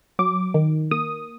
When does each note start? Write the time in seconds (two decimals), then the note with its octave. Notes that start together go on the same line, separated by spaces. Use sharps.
0.19 F#3 D6
0.54 D#3
0.91 A#3 D#6